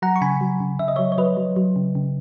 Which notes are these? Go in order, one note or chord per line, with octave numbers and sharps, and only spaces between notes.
F#3 F#5 A#5
C#6
C#3 G#5 B5
F#3
C#3
C#3 E5
D#5
F#3 C#5 E5
C#5
F#3 B4 D#5
F#3
F#3
C#3
C#3